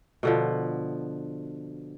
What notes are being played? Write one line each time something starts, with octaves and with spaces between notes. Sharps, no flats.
B2 D3 F3